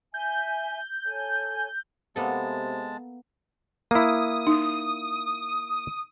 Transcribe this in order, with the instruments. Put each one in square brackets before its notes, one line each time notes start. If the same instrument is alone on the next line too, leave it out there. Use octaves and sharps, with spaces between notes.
[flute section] E5 G#5 [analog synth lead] G6
[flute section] A4 C#5 G#5
[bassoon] C3 [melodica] G#3 A5 [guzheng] A#3 B3 A4
[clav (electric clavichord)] A#3 E4 [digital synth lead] D#6
[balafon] D#4